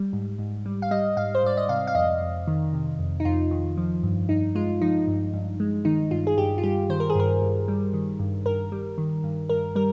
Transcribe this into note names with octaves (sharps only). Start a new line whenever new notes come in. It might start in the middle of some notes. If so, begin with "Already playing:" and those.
Already playing: G3
G#2
G#2
G3
F5
G3 D#5
G#2 F5
C5
G#2 D5
D#5
C3 F5
F5
F2 D#5
F2
D#3
C3
F2
D#4
F2 F4
D#3
F3
G2
G2 D#4
G#3 F4
F3 D#4
G2
G2
G#3
D#3 D#4
G2 F4
G#4
G2 G4
F4
G3 G4
D#3 C5
A#4
G#4
G2 A#4
G2
G3
D#3
G2
G2 A#4
G3
D#3
G2
G2 A#4
G3 A#4